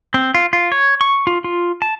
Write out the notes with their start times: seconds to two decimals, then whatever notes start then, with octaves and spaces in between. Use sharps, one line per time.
0.14 C4
0.34 F4
0.53 F4
0.72 C#5
1.01 C#6
1.27 F4
1.44 F4
1.82 A5